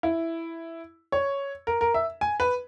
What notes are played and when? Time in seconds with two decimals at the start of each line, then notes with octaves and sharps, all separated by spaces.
0.03 E4
1.12 C#5
1.67 A#4
1.81 A#4
1.94 E5
2.21 G#5
2.40 B4